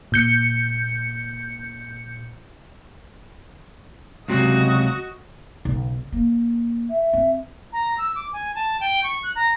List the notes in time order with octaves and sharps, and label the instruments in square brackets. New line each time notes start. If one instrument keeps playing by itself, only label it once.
[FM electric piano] A#2 G6 C#7
[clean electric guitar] C#2 C3 F#3 [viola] F#4 D#5
[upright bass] B1 C#3
A#3
[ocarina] E5
[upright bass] C4
[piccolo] A#5
E6
D6
G#5
A5
G5
C#6
F#6
A#5